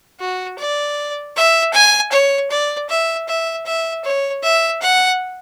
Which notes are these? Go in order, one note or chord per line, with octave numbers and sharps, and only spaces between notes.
F#4
D5
E5
G#5
C#5
D5
E5
E5
E5
C#5
E5
F#5